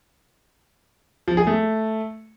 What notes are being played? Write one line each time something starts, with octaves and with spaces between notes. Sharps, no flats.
F3
G#4
A3